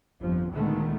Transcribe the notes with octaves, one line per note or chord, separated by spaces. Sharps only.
G1 F2 F3
D2 A#2 D#3 G#3 A3 B3